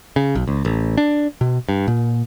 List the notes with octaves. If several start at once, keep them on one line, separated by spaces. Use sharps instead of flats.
C#3
B1
C#2
A1
D4
B2
G2
A#2